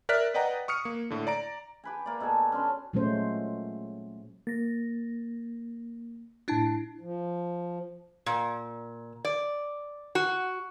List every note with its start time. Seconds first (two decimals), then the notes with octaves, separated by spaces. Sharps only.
0.09 A#4 D5 E5 F6 F#6 B6
0.34 B4 D5 D#5 F#5 G5 A#5
0.68 C#6 D#6 F6 C#7
0.85 A#3
1.10 A2 D3
1.27 D5 A#5 D7
1.84 G4 B4 G#5
2.06 A#3 D5
2.20 B2 A4 B4 G#5
2.52 C#4 D4 C6
2.93 A#2 F#3 G#3 A3 C#4 C5
4.47 A#3 A6 A#6
6.48 A2 D4 E4 A5 A6
7.01 F3
8.26 A#2
9.25 D5
10.15 F#4